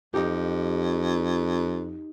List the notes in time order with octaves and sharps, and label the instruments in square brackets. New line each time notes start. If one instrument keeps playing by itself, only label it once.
[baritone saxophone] F2 [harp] D#4 G4